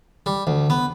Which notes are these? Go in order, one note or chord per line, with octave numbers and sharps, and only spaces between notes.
G3
D2
B3